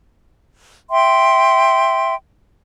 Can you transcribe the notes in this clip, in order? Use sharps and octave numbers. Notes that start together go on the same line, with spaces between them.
E5 G5 C6